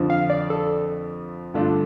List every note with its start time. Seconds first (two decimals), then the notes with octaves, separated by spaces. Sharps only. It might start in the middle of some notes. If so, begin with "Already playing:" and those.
Already playing: F2 D3 F3
0.10 F5
0.30 D5
0.50 A4
1.54 G2 D3 A3 D4 F4